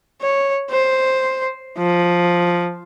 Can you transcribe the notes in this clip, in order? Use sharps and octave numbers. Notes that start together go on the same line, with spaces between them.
C#5
C5
F3